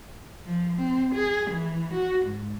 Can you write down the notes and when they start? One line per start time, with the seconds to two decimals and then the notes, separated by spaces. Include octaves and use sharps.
0.46 F3
0.77 C4
1.14 G#4
1.51 E3
1.93 F#4
2.26 G#2